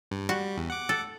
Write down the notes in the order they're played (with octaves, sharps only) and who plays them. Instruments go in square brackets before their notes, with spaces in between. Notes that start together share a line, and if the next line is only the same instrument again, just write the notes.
[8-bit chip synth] G2
[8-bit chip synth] G3 [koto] F#4
[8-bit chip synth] E2
F#5 D6
[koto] A4